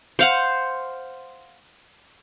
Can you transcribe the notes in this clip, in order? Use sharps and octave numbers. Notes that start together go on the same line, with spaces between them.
C5 F5 F#5